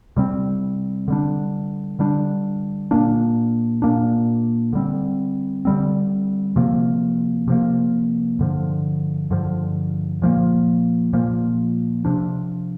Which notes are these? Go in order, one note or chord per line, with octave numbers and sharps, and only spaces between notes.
C3 G3 C4
D3 G3 D4
D3 G3 D4
A#2 A#3 D4
A#2 A#3 D4
D3 G3 C4
D3 G3 C4
C3 F3 A#3
C3 F3 A#3
G2 D3 F3
G2 D3 F3
A#2 F3 A#3
A#2 F3 A#3
C3 F3 D4